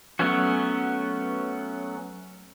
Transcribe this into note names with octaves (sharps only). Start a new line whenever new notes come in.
F#3 A3 B3 C#4 F#4